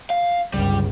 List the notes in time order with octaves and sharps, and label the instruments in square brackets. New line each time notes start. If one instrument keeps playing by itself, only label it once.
[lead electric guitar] F5
[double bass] G1 C#2 [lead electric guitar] G3